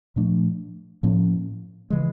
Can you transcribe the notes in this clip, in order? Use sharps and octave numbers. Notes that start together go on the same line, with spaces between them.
A#2 F3 A3 D4
A2 F3 A#3 C#4
C#3 E3 G#3